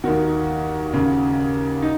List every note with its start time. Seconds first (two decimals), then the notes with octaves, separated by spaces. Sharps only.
0.04 D#2 D#3 F#4
0.93 D#2 C#3
1.82 D#4